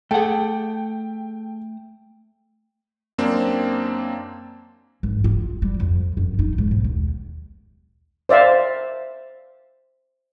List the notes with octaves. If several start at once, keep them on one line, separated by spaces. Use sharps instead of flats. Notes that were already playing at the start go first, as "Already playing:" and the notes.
A3 G#4 A4 F#5 G5
F#2 A#3 C4 D4
G#1
F4
G3
F2
F#2
D#4
G#2
B1
D#2
C5 D5 E5 F5